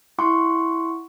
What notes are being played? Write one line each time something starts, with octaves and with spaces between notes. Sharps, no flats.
E4 F#5 C6 C#6